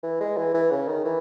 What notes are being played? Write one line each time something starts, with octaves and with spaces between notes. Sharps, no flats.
E3
G#3
E3
E3
C#3
D#3
E3